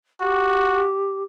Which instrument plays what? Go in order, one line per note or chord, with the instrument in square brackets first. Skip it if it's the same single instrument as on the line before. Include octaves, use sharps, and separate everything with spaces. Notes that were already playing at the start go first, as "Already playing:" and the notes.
[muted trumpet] F#4 [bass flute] G4